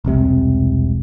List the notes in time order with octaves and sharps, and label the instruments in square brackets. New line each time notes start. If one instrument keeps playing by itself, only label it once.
[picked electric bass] E1 C2 C3 G#3